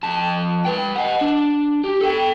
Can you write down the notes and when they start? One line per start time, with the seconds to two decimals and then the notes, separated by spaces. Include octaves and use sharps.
0.03 F2 A5
0.65 B4 G5
0.96 D#5 F#5
1.21 D4
1.84 G4
2.01 A4 G5